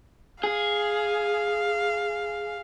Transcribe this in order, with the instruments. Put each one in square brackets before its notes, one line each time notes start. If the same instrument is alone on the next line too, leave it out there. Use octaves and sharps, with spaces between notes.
[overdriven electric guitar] G#4 [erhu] F5